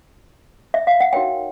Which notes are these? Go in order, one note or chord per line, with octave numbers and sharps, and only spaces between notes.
E5
F5
F#5
D#4 F#4 A#4 C#5 G5